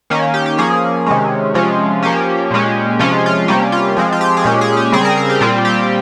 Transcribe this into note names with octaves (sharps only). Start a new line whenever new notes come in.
D#3 A#3 C#4
G4
G4
F3 A#3 C#4 G#4
C3 D#3 G#3 C#4
C3 F3 G#3 C#4 F4
F3 A#3 C#4 G4
A#2 G#3 C#4
C3 F3 G#3 C#4 F4
F4
C3 G3 A#3 C#4 G4
F4
F3 G#3 C4
F4
G4
G#4
A#2 G#3 C#4 G4
G#4
G4
C#3 G3 C4 G#4
A#4
A#4
G4
A#2 G3 C4 F4
G4